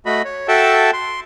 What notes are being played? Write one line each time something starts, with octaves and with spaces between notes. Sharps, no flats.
A3 F#4 D#5 B5
C#5
F#4 A4 E5 G5 A5
C6